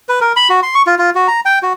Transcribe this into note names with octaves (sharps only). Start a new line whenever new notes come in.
B4
A#4
B5
F#4
C6
C#6
F4
F4
F#4
A#5
G5
F#4